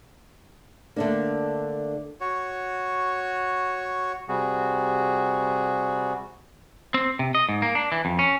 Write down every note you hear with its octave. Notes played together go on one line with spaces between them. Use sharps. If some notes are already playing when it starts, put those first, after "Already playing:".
D3 A3 A#3 D4
F#4 C#5
C3 G3 F#4 G#4
C4
C3
D#5
G#2
A#3
D4
E3
F2
C#4